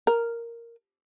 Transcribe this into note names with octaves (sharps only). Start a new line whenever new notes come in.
A#4